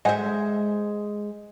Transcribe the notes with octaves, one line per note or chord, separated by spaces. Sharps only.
G#3 C5 D#5 E5 F#5 G#5